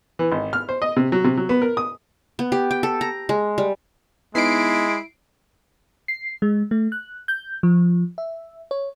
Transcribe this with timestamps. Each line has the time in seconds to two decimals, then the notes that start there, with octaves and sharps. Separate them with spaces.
0.19 E3
0.32 G#1
0.53 F6
0.69 C5
0.82 D#5
0.96 C3
1.12 F#3
1.24 C3
1.37 F#3
1.49 B3
1.62 A#4
1.77 D#6
2.39 B3
2.52 G4
2.71 G5
2.83 A4
3.01 A#5
3.29 G#3
3.58 G3
4.35 G#3 B3 D#4 E4 C7 D7
6.08 C7
6.42 G#3
6.71 A3
6.92 F#6
7.28 G6
7.63 F3
8.18 E5
8.71 C#5